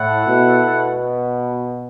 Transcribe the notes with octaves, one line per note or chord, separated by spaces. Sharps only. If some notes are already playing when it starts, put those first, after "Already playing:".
Already playing: A2 A3 E4 A4 F#5
B2
B2